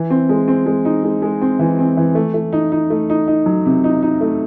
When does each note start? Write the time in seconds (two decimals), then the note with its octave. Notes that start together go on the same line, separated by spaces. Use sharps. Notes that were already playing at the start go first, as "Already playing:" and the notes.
Already playing: E3
0.10 C4
0.29 G#3
0.48 C4
0.66 G#3
0.85 D#4
1.04 G#3
1.22 G#3
1.42 C4
1.59 E3
1.79 C4
1.97 E3
2.15 A3
2.34 A3
2.53 D#4
2.72 D#4
2.90 A3
3.10 D#4
3.28 D#4
3.46 F#3
3.65 C3
3.84 D#4
4.03 D#4
4.21 A3